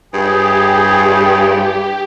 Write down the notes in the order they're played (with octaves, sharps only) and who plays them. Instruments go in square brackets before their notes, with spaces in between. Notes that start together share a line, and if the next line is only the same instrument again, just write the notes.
[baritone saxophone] G2 [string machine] G4 [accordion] G#4